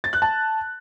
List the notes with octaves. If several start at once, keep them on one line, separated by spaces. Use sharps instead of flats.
A6
F#6
A5